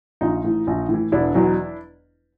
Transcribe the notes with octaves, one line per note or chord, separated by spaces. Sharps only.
A#1 D#4 F4
A2 E3
A#1
A2 E3
E1 D4 E4
E2 B2 F#3